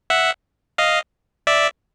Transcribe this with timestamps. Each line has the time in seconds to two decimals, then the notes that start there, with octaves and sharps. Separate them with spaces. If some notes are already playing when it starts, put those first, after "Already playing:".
0.10 E5 F#5
0.78 D#5 F5
1.47 D5 E5